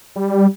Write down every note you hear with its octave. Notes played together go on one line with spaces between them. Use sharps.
G3